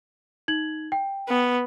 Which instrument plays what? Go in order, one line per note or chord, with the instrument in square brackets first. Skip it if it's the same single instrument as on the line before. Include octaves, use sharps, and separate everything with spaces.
[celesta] D#4 G#6 F#7
G5
[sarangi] B3